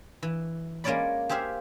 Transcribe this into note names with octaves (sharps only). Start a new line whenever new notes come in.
E3
G#3 A#3 C#4 C#5 D5 B5
G4 G#4 C5 E5 F5